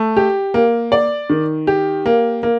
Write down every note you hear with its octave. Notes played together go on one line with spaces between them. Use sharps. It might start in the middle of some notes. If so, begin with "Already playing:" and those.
Already playing: A3
G4
A#3
D5
D#3
G4
A#3
A#3